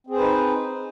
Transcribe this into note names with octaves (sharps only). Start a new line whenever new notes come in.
C4 D#4 G#4 B4 C5